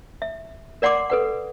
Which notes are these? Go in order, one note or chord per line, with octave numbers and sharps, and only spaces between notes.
E5
A#4 D5 F#5 C6 D6
A4 B4 F#5